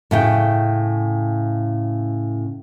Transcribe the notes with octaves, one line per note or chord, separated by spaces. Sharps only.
A2 C#3 G5